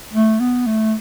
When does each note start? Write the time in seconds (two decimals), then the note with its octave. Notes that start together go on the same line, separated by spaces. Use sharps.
0.13 A3
0.40 B3
0.67 A3